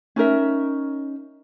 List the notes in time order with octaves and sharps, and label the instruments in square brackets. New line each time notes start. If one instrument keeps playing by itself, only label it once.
[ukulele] C#4 D#4 A#4 E5